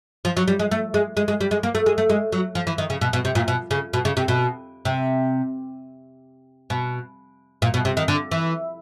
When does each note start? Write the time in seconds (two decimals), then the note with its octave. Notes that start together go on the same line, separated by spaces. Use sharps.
0.25 F3
0.37 F#3
0.48 G3
0.59 G#3
0.71 A3
0.94 G#3
1.17 G#3
1.28 G#3
1.41 G3
1.51 G#3
1.63 A#3
1.75 A3
1.86 G#3
1.98 A3
2.09 G#3
2.32 F#3
2.55 F3
2.67 E3
2.78 D#3
2.90 C#3
3.01 B2
3.13 B2
3.25 C3
3.35 A#2
3.48 B2
3.71 C#3
3.93 B2
4.05 C#3
4.17 C3
4.28 B2
4.85 C3
6.70 B2
7.62 A#2
7.74 B2
7.85 C3
7.97 D#3
8.08 D3
8.32 E3